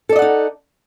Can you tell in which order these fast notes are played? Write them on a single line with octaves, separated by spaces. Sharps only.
A4 D5 D#5 F#5 D#4